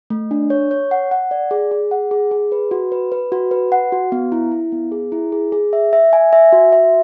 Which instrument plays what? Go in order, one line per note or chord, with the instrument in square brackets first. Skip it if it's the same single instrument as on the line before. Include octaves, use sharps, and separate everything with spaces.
[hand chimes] A3
D4
C#5
C#5
F#5
F#5
D5
G#4
G#4
F#5
G#4
G#4
B4
F#4
B4
B4
F#4
B4
F#5
F#4
B3
E4
E4
B3
G#4
E4
G#4
G#4
E5
E5
G#5
E5
F#4
E5